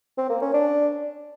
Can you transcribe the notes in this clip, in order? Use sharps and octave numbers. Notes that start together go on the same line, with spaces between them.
C4
A#3
C#4
D4